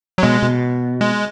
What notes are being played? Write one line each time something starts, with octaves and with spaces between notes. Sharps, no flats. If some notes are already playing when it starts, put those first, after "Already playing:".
F#3
B2 G#3
B2
G#3